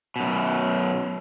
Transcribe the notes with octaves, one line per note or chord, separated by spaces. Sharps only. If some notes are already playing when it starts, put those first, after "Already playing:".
F#2 B2